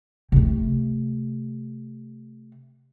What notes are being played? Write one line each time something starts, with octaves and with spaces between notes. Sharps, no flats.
C3 A3